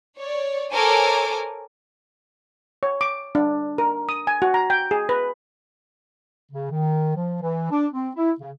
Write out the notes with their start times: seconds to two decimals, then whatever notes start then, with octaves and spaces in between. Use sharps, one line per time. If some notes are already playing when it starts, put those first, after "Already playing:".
0.18 C#5 D5
0.72 A4 A#4 C5 C#5 G#5 D6
2.83 C#5
3.01 D6
3.35 D4
3.78 A#4
4.09 D#6
4.27 G#5
4.42 F#4
4.54 A#5
4.70 G5
4.91 G#4
5.09 B4
6.52 C#3
6.70 D#3
7.16 F3
7.41 E3
7.70 D4
7.92 C4
8.16 E4
8.40 C#3